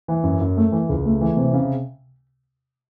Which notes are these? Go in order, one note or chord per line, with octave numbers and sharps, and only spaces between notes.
E3
F#2
F#2
A3
E3
C#2
A3
E3
C3
C#3